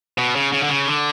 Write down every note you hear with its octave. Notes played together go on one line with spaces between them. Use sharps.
B2
C#3
C#3
D3
C#3
D3